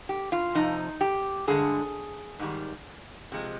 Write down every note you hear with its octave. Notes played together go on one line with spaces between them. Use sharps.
G4
F4
F2 C3 F3 D#4
G4
G2 D3 G#3 G#4
G#2 D#3 G3
C3 F3 G#3